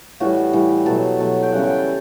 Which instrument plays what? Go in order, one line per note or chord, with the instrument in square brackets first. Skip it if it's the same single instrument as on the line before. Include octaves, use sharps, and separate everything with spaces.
[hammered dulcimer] A2 E3 G3 F#4
A2 E3 G3
B2 F#3 A3 A4
B2 F#3 A3
G5
C#3 E3 G3 F#5
G5